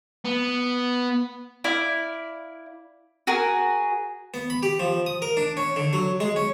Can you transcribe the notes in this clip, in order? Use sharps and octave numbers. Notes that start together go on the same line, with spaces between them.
B3
E4 D5 F5
F#4 G#4 A#4
B3
B5
G4
F3
D#6
A#4
D4
C#4
D3
F#3
G#3
C#4